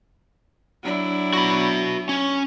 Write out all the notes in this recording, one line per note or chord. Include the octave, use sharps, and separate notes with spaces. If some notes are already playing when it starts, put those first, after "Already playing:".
F#3 D4 E4
F#4 B5
C#4